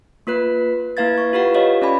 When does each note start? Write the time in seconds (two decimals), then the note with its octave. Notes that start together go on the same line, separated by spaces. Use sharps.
0.27 A#3 F4 B4 F#6
0.97 A#3 E4 B4 F5 G#6 A6
1.18 C#6
1.33 F4 G4 B4 F5 F#5
1.54 F4 G4 C#5 D#5 F5
1.82 C#4 D5 G#5 B5